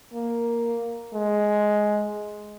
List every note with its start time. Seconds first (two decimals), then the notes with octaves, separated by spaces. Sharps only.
0.13 A#3
1.14 G#3